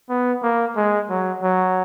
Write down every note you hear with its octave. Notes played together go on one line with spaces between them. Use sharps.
B3
A#3
G#3
F#3
F#3